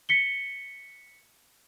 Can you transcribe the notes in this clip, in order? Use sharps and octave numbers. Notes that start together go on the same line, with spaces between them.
B6 C#7 G7